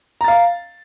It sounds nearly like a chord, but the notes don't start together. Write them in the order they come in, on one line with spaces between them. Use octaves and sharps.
A#5 A6 F5